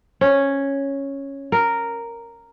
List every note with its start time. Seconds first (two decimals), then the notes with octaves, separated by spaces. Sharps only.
0.21 C#4
1.52 A#4